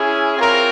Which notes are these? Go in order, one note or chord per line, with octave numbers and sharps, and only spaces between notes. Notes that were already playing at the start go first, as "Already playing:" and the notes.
Already playing: C#4 E4 G#4
C4 F4 A#4 C#5